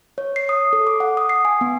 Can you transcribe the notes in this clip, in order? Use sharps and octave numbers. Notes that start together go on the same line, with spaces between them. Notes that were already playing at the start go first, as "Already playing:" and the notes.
C#5
C7
D#6
A4
D6
F#5
D#6
C7
G#5
B3